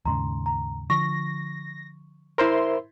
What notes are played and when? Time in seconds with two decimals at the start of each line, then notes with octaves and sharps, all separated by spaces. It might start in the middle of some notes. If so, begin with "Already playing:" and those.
0.05 D#2 G#2 C#3 A#5 C6
0.46 A#5
0.90 D3 F3 C#6 A#6
2.38 E4 A#4 C5 E5 C6